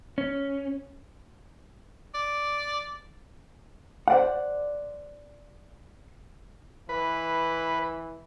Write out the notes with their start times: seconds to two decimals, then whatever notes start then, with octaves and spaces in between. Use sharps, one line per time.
0.18 C#4
2.14 D5
4.08 C5 D5 F#5
6.89 E3 B4